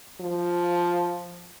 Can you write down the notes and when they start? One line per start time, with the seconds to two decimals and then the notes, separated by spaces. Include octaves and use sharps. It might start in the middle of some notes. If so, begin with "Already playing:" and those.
0.20 F3